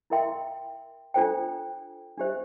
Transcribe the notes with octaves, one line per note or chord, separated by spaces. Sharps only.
E4 A#4 E5 G5 C6
D4 F4 A4 C5 G5
D4 G4 C5 E5